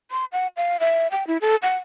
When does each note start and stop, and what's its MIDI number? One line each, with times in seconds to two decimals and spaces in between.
0.11 0.25 84
0.33 0.47 78
0.57 0.77 77
0.80 1.07 76
1.11 1.26 79
1.27 1.37 64
1.41 1.56 69
1.62 1.75 78